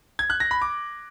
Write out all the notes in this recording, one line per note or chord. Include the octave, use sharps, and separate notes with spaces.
G#6
F#6
A#6
B5
D6